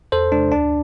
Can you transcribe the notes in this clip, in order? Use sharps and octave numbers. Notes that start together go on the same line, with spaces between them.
E2 A4 C5
C3 G#3 D4
D2 D4